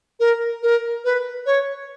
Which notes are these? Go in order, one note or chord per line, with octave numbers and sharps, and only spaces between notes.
A#4
A#4
B4
C#5